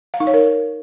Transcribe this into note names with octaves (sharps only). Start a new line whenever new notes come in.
F5
D#4
C#5
A#4